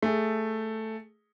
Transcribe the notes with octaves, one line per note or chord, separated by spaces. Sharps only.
A3 G#4